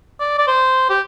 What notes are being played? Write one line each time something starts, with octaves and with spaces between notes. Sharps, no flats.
D5
D5
C5
G4